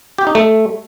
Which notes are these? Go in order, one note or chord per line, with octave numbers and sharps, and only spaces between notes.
G4
D#4
A3